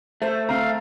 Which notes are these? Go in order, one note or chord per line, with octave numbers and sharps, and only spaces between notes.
A3 C5
C4 F5 A#5